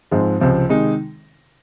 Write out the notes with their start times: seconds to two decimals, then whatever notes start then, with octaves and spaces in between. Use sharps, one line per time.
0.11 G#2 F3 G#3 C4
0.40 C#2 C3 F3 C4
0.69 C3 D#3 G#3 D#4